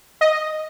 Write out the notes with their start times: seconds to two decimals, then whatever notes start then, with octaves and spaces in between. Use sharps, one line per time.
0.21 D#5